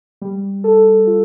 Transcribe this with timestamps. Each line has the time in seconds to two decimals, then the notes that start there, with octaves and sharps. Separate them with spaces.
0.22 G3
0.64 A4
1.07 F4